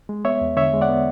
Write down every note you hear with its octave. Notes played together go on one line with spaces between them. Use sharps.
G#3
B3 C#5 E5
E2
D3 C#5 E5
G#3
D5 F#5
B3